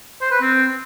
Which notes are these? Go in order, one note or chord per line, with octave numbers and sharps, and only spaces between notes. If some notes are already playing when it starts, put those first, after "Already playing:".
C5
B4
C4